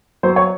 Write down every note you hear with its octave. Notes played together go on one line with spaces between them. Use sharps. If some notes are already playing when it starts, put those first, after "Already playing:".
F#3 C5
C#5